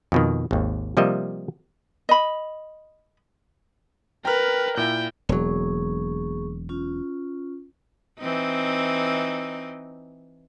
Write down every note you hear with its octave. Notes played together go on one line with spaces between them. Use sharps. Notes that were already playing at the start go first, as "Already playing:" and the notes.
F2 B2 D#3
G#1 D#2
C3 F3 G3 A#3 D#5 E5
D#5 B5
A#4 B4 G5 A#5 F6
A#2 E4 G5
E1 F#3 A#3 G#4 C#6
C#4 F4
E3 C4 D#4